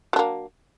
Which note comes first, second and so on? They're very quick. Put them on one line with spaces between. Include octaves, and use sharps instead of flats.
F#3 D4 A#3